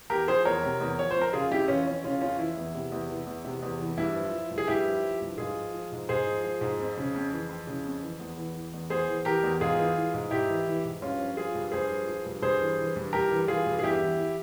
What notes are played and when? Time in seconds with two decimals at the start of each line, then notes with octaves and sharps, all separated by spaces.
0.10 E2 G4 A#4
0.28 F3 G#4 C5
0.45 E2 A#4 C#5
0.63 C3
0.80 E2
0.98 F3 C#5
1.11 C5
1.16 F2
1.21 A#4
1.33 C#3 F4 G#4
1.51 F2 E4 G4
1.68 E3 C#4 F4
1.87 F2 C#4
2.04 C#3 C#4 F4
2.21 F2 C#4 F4
2.39 E3 E4
2.57 E2
2.74 C3
2.92 E2
3.10 E3
3.27 E2
3.45 C3
3.62 E2
3.80 E3
3.98 G2 E4
4.16 F3
4.32 F3
4.50 G2
4.58 G#4
4.68 G2 E4 G4
4.85 F3
5.03 F3
5.21 G2
5.38 G#2 F4 G#4
5.57 F3
5.74 F3
5.92 G#2
6.09 G#2 G#4 C5
6.27 F3
6.44 F3
6.61 G#2
6.80 F2
6.97 C#3
7.15 F2
7.32 E3
7.49 F2
7.67 C#3
7.85 F2
8.02 E3
8.20 E2
8.38 E3
8.55 E3
8.73 E2
8.90 E2 G#4 C5
9.09 E3
9.25 E3 G4 A#4
9.43 E2
9.60 G#2 F4 G#4
9.78 E3
9.97 E3
10.14 G#2
10.31 G#2 E4 G4
10.49 E3
10.67 E3
10.85 G#2
11.02 G2 C#4 F4
11.19 F3
11.37 F3 F4 G#4
11.55 G2
11.72 G2 G#4 C5
11.90 F3
12.07 F3
12.25 G2
12.42 G2 G#4 C5
12.60 E3
12.78 E3
12.96 G2
13.13 G2 G4 A#4
13.30 E3
13.48 E3 F4 G#4
13.66 G2
13.79 G#4
13.83 E2 E4 G4
14.01 E3
14.18 E3